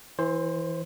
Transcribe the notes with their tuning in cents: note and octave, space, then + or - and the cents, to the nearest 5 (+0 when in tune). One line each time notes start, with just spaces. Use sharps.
E3 -5 C5 +25 C6 -20